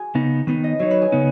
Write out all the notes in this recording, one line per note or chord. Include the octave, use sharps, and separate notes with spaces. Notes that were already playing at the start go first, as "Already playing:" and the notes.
Already playing: F#4 G#4
C#3 B3 D#4
D#3 B3 D#4 B4
D#5
F#3 D#4 C#5
B4
G#4
C#3 B3 D#4